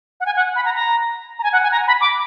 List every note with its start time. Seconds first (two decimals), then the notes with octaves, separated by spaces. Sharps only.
0.20 F#5
0.26 G#5
0.36 F#5
0.56 B5
0.65 A#5
0.75 A#5
1.39 A#5
1.43 G#5
1.53 F#5
1.63 G#5
1.72 A#5
1.87 B5
2.01 D6